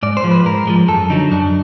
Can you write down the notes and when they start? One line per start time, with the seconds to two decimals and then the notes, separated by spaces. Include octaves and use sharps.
0.03 G#2 D5
0.17 C5
0.24 F3 G#3
0.31 B4
0.45 G#2 A#4
0.67 F3 G#3
0.88 F#2 A4
1.10 D3 F#3 D#4
1.31 F#2 D4